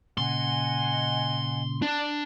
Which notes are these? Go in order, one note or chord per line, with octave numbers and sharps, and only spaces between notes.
A#2 C#3 D#5 F#5 G#5 C6
D4